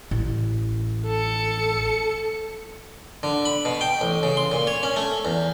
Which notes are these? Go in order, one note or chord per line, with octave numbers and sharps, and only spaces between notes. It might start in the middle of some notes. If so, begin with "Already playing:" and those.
A1
A4 C#7
D3
B5
B2
G5
A1
C#3
C6
A#2
C#5
C#4
A3
E2